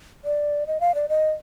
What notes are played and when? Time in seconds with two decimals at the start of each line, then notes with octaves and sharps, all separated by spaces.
0.24 D5
0.67 D#5
0.80 F5
0.95 D5
1.09 D#5